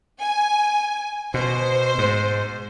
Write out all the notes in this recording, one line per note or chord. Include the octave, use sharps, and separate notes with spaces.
G#5
B2 C5
G#2